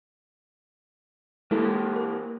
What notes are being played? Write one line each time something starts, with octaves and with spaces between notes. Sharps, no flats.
E3 G#3 A#3 E4 A4
A#4